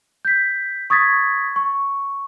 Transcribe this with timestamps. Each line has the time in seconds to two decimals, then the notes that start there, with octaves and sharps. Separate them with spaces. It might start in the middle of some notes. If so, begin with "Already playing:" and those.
0.25 G6 B6
0.90 C#6 D#6 G#6 A6 B6
1.56 C#6